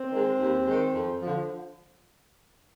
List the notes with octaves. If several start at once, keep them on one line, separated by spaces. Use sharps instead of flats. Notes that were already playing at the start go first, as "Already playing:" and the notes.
Already playing: C4
D#3 G#3
D#2
D#3 G#3
F2
D3 F3